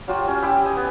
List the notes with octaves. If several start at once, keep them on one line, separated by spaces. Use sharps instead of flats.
F#3 F4 G4
C#4
E4 G4 G5
D#5 G#5
B3